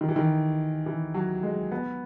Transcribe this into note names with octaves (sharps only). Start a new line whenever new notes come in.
D#3
E3
D#3
E3
F#3
G#3
B3